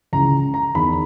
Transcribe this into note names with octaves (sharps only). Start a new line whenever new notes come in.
C#2 C#3 E3 A#5
A#5
E2 D#3 B5